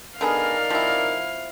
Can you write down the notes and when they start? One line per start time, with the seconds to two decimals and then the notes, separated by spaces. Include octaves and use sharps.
0.21 D3 B3 D#4 G#4 A#4 D5 F5
0.70 F3 C4 E4